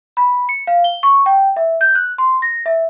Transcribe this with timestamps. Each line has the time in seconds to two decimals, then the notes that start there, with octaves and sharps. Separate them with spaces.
0.17 B5
0.49 C#7
0.67 F5
0.84 G7
1.03 C#6
1.26 G5
1.57 E5
1.81 G6
1.95 F#6
2.18 C6
2.42 A#6
2.66 E5